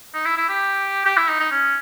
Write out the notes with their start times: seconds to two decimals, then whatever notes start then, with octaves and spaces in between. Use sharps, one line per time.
0.15 D#4
0.26 E4
0.37 E4
0.49 G4
1.06 G4
1.18 E4
1.29 D#4
1.40 D#4
1.51 C#4